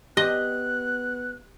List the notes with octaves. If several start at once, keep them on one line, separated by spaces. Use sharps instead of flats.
B3 G4 D#5 F#6